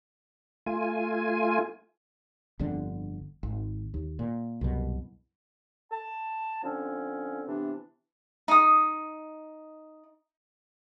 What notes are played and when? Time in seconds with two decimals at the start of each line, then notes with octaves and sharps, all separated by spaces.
0.66 A3 F4 G#5
2.59 G1 F2 D3 C4
3.43 G#1
3.94 D#2
4.19 A#2
4.61 C2 F#2 B2
5.92 A5
6.63 D3 F3 C4 C#4
7.47 C3 E3 B3 D4
8.48 D#4 D#6